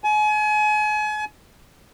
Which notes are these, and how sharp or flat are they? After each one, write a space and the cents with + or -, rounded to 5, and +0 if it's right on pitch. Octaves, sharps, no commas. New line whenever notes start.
G#5 +35